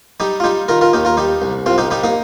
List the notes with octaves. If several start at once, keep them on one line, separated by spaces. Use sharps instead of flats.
G3 D#4 G4
F4
G3 D#4 G4
D#3 F4 A#4
F4 A#4
D#2 D#4 G4
F4 A#4
G3 D#4 G4
C2
C2 C4 F4
D#4 G4
G3 D#4 G4
A#3 D#4